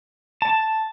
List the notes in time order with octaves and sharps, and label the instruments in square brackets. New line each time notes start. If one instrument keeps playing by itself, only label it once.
[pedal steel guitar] A5